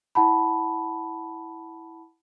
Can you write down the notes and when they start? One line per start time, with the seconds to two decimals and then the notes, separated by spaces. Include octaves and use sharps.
0.15 E4 F#5 A5 B5